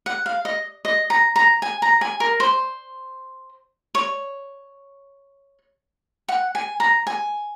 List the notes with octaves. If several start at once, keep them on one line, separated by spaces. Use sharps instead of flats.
F#5
F5
D#5
D#5
A#5
A#5
G#5
A#5
G#5
A#4
C5
C#5
F#5
G#5
A#5
G#5